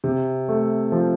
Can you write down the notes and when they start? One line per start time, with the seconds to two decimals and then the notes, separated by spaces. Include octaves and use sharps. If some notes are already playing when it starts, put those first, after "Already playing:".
0.04 C3
0.49 A3
0.92 F3